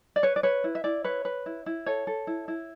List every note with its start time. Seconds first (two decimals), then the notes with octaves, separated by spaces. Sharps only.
0.16 D5
0.23 B4 C#5
0.36 D5
0.43 B4 C#5
0.64 E4
0.75 E5
0.84 E4 D5
1.04 B4 C#5
1.25 B4
1.46 E4
1.66 E4
1.86 A4 C#5
2.07 A4
2.27 E4
2.48 E4